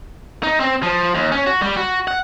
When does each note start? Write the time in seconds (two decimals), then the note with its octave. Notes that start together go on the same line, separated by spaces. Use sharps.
0.43 D#4
0.60 C4
0.83 F3
1.15 D#2
1.32 C#4
1.46 F#4
1.62 G3
1.76 F#4
2.08 F#5